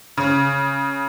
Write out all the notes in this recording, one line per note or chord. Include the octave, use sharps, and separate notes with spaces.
C#3